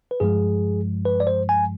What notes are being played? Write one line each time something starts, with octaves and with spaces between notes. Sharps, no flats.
B4
G2 F3 G#3 G#4
B4
D5
C5
G#5